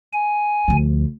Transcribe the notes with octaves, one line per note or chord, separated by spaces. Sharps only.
G#5
D2 F3